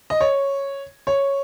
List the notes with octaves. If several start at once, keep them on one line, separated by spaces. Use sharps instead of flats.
D#5
C#5
C#5